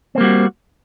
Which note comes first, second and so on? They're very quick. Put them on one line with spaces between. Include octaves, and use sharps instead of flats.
C4 A#3 G3 F#4